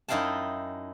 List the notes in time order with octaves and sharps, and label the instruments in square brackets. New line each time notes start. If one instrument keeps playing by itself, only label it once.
[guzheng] F#2 D#4 E4 F5 G5 A5